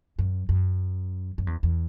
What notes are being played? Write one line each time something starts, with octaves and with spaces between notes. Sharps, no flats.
F#2
F#2
F#2
E2
E2